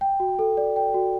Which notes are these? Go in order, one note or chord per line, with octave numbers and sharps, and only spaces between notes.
G5
F#4
A4
D5
G5
F#4